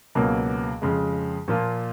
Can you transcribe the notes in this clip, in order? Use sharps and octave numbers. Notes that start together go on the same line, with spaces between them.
C#2 B2 F#3 A#3
F2 C#3 G#3
A#2 F3 A#3 F4